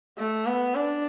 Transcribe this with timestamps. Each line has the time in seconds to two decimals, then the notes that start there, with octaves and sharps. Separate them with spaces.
0.18 A3
0.46 B3
0.75 D4